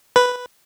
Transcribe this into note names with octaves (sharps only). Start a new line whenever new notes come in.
B4